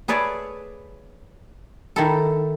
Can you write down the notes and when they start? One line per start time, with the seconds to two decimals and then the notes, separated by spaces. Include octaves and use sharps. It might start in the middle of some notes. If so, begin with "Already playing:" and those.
0.08 G#4 B4 C#5 D5 E5 A5
1.96 D#3 E4 A4